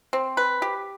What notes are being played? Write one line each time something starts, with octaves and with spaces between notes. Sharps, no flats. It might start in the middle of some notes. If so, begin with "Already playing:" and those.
C4
B4
G4